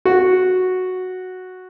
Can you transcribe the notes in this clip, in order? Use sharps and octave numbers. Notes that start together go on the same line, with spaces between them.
F#4